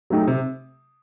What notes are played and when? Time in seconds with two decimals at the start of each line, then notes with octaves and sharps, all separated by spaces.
0.10 F#3 A3 D#4 G4
0.27 C3